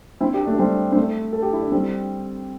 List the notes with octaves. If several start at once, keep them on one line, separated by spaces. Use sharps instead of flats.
C4 E4
D4 G4
A3 D4
G3 C4
C4
A3
A4
G4
E4
D4
G3 C4